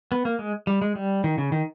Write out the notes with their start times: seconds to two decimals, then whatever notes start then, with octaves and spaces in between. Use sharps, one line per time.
0.12 B3
0.25 A#3
0.39 G#3
0.67 G3
0.82 G#3
0.95 G3
1.24 D#3
1.38 C#3
1.52 D#3